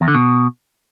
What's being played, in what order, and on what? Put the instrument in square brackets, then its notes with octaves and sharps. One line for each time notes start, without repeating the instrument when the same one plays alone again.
[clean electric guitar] E2
D3
B2